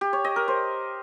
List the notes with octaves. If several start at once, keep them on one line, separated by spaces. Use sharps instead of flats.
G4
C#5
D#5
A#4
C5